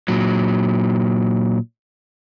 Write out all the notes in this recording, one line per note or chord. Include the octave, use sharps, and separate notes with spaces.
A#2 F#3